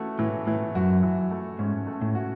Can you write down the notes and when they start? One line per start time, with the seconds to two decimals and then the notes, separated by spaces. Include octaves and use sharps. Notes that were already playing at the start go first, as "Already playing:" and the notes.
Already playing: E3 A3 C#4 F#4
0.19 A2 E3
0.47 A2 E3
0.75 F#2 F#4
1.03 E3
1.31 A3
1.59 G#2 C#4
1.87 A3
2.01 A2
2.15 F#4